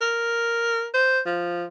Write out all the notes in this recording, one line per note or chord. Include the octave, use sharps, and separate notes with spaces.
A#4
C5
F3